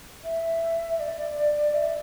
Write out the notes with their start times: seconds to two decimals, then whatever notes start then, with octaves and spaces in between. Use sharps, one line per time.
0.24 E5
1.00 D5
1.74 E5